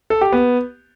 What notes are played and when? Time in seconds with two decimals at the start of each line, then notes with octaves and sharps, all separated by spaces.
0.10 A4
0.21 G4
0.32 B3